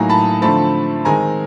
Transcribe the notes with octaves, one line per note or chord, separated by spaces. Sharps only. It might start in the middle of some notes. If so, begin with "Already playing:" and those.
Already playing: A2 F#3 A#3 D#4 G#5 A#5
A5 B5
D3 F3 A3 C4 A5 B5
D#3 G#3 C4 G#5 A#5